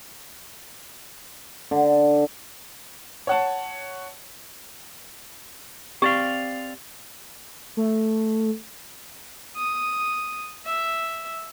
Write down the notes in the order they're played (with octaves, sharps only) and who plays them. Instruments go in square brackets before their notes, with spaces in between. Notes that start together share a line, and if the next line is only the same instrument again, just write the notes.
[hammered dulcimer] D3
[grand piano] C#5 F#5 A5
[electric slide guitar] C4 D5 F5 [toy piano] G4
[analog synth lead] A3
[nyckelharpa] D#6
E5